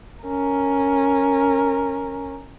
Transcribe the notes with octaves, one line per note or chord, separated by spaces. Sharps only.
C#4 A#4